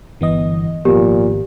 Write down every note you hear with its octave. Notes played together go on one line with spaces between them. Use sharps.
G1 E3 B3 D#5
G#1 A#2 F3 B3 G4